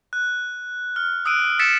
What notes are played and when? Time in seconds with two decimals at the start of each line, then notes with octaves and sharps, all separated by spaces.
0.13 F#6
0.96 F6
1.25 D#6 E6 F#6 D7 D#7
1.59 E6 A6 B6 C#7 E7